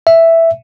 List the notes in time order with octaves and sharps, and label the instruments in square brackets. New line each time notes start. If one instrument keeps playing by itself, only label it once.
[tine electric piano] E5